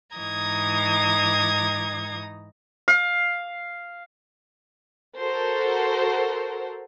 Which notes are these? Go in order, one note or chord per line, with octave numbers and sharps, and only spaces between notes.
G#2 E3 D#4 A#5 D#6 G#6
F5
F#4 A4 A#4 C5